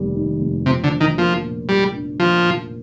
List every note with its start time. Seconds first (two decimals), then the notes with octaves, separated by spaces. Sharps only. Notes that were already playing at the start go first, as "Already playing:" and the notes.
Already playing: F1 D#2 G3
0.15 D#3
0.41 F1
0.66 C3 F3
0.84 D3
0.93 D4
1.01 D#3
1.18 F3 A#3
1.43 A#2
1.69 F3 G3
1.94 D4
2.20 F3 A#3
2.45 A#2